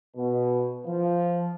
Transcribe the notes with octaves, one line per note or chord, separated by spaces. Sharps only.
B2
F3